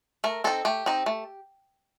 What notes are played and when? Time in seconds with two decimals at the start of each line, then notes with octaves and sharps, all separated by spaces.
0.24 A3 A#4
0.44 C4 D#4 A4
0.65 A3 G4
0.86 C4 D#4
1.06 A3